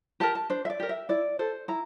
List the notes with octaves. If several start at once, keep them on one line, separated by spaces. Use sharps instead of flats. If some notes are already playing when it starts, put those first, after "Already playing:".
G4 A#4 A5
A5
D4 C5
E5
D5
G4 A#4
E5
E4 D5
A4 C5
E4 A#5